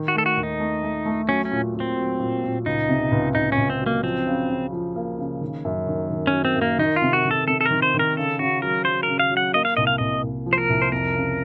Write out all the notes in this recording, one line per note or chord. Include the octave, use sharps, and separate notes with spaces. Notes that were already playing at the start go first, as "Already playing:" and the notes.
Already playing: D#3
F#4
A3 A4
F#4
D#2
D#4
A3
A3
A3
F#3 C#4
C#4
A#2
A#2
C4
F#3
A#2
A#2
C#2 D#4
C3
C#2
C#2 D#4
C#4
C#2
C4
F#3
A#3
F3 C4
C#3
C#3
F3
A#3
C#3
D#3
F#2
D#3
D#3
C#4
F#3
C4
F#2
A#3
D#3 D#4
F4
C3
F#4
D#3
A4
C3 A4
A4
D#3 A#4
C5
D#3
A#4
C#3 A4
C#3 F#4
F#3 A#4
F#3 C5
C#3 A#4
F5
F#3
F#5
A#3 D#5
F5
C2 D#5
F5
C2 D#5
C2
F3
C5
A#4
C2
C5
F2 A#4
C#3